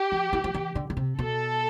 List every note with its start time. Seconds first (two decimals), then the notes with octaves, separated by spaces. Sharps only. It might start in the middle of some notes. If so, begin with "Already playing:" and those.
Already playing: G4
0.12 F3
0.33 E3
0.44 F3
0.54 E3
0.75 D3
0.90 D3
0.97 C3
1.18 B2 A4